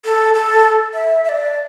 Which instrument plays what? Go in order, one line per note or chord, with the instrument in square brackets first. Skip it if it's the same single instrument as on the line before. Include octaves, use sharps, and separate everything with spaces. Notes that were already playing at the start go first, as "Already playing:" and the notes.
[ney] A4
A4
E5
E5
D5